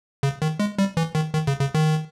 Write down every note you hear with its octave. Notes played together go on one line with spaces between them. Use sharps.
C#3
D#3
G#3
G3
E3
D#3
D#3
C#3
C#3
D#3